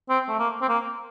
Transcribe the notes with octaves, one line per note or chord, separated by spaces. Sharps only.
C4
A3
A#3
C4
A#3